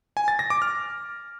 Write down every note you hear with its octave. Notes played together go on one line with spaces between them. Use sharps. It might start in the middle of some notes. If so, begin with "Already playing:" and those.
G#5
A6
A#6
D6
F6